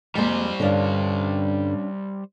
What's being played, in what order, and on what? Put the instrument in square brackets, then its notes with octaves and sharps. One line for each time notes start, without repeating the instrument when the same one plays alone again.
[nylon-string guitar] F2 [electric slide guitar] G3 C5 [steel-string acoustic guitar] G#3 A#3
[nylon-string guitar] G2 D3 [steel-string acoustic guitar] C#4 D4 F5